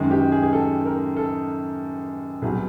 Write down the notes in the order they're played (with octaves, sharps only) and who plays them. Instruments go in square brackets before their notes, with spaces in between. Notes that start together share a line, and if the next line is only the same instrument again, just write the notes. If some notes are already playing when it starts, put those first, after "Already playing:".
Already playing: [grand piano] F#2 D#3 G#3 G#4
G4
G#4
G#4
A4
A#4
A4
C2 B2 F#3 G#4